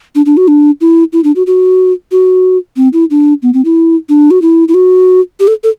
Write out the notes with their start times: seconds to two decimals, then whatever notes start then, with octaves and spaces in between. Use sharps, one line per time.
0.15 D4
0.26 D4
0.37 F#4
0.48 D4
0.81 E4
1.13 E4
1.24 D4
1.36 F#4
1.47 F#4
2.12 F#4
2.77 C4
2.93 E4
3.10 D4
3.43 B3
3.54 C4
3.65 E4
4.09 D4
4.31 F#4
4.42 E4
4.68 E4
4.74 F#4
5.40 G4
5.48 A4
5.64 A4